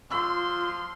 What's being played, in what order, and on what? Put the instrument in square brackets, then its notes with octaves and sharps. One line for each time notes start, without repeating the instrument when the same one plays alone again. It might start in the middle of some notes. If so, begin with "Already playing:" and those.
[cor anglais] F3 [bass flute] F4 [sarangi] C6 [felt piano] C#6 E6 F6